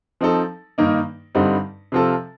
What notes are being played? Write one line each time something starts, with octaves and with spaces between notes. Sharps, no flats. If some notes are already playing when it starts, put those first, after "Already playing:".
F3 C4 D#4 A4
G2 D#3 A#3 D#4
G2 D3 G3 C4 D#4
C3 F3 C4 F4 A4